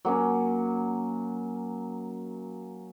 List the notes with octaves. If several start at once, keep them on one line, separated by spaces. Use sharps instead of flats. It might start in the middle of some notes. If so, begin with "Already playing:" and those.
F#3 A#3 C#4